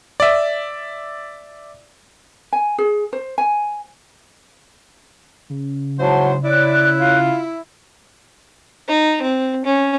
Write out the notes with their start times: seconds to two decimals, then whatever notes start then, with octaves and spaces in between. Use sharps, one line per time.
0.20 D5 E5
2.53 G#5
2.78 G#4
3.13 C5
3.38 G#5
5.50 C#3
6.00 G#2 F#3 E4 C5 F#5 A5
6.44 E4 C#5 D5 F#6
6.99 F4
8.88 D#4
9.22 C4
9.65 C#4